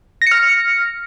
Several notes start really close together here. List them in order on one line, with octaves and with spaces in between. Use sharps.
A#6 C#7 F6